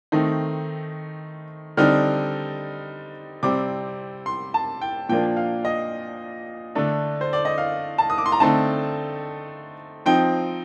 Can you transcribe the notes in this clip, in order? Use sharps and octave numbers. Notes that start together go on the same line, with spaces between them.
D#3 A3 C4 D#4
D3 G3 C4 D#4 F6
C3 G3 C4 D6
C6
A5
G5
A#2 F3 A#3 D4 G5
F5
D#5
D3 A3 D4
C5
D5
D#5
F5
A5
D#6
D6
C6
A#5
D3 A3 C4 D#4 A5
F3 C4 D#4 G5